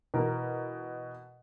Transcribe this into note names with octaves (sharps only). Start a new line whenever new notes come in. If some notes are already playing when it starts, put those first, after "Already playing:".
B2 E3 A#4